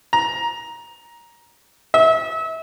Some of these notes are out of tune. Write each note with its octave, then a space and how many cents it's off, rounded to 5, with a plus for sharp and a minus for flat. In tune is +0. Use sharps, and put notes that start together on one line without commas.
A#5 +15
E5 -30